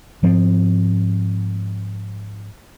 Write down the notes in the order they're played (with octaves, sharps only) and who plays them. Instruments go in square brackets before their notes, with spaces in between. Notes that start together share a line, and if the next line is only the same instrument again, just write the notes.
[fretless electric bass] G#2 F3 C4